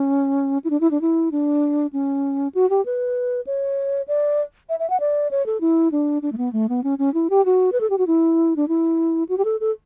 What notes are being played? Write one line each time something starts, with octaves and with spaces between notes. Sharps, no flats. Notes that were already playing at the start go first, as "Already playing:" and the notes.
Already playing: C#4
E4
D4
E4
D4
E4
D4
C#4
F#4
G4
B4
C#5
D5
E5
E5
F#5
D5
C#5
A4
E4
D4
D4
A3
B3
A3
B3
C#4
C#4
E4
G4
F#4
B4
A4
G4
F#4
E4
D4
E4
F#4
G4
A4
A4